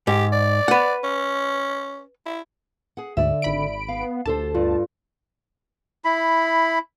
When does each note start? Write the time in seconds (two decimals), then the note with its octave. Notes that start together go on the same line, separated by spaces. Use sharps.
0.07 G#2 G4
0.32 D5
0.68 B4 F#5
1.04 C#4
2.26 E4
2.97 G#4 F#5
3.17 D2 G#2 D3 D5 E5
3.42 G#1 B5 D7
3.88 B3 F5
4.26 D2 G4 A4 C5 A5
4.55 G2 F4
6.05 E4 B5